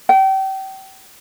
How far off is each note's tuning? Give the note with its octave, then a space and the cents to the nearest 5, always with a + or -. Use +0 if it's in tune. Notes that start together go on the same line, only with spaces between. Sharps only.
G5 -30